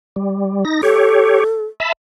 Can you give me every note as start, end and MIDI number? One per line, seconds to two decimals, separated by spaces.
0.16 0.64 55
0.65 0.81 63
0.65 0.81 94
0.83 1.44 67
0.83 1.65 69
0.83 1.44 73
1.80 1.92 76
1.80 1.92 81
1.80 1.92 83